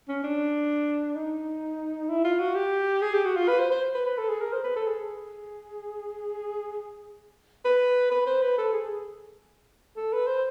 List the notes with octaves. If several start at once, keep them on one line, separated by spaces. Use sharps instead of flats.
C#4
D4
D#4
E4
F4
F#4
G4
G#4
G4
F#4
F4
B4
C5
C5
B4
B4
A4
G#4
A#4
C5
B4
A4
G#4
B4
B4
C5
B4
A4
G#4
A4
B4
C5